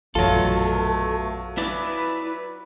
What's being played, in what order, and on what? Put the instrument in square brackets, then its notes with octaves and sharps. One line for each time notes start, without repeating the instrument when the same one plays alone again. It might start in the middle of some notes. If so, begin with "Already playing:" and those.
[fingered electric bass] A#1 F#2 E3 [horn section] B2 A3 [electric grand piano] F#3 F4 [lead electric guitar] A4
[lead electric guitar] E4 D5 [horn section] B4